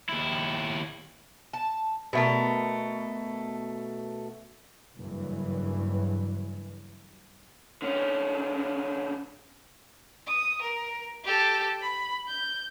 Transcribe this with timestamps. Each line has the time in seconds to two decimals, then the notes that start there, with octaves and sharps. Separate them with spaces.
0.09 D#2 E4
1.53 A5
2.13 B2 A3 A#4
4.98 F#1 G2 E3
7.82 D3 C#4
10.27 D#6
10.62 A#4
11.25 G4 A4
11.81 B5
12.28 G6